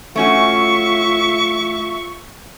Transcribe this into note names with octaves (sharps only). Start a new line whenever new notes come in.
A3 C#4 F4 F#4 E5 C#6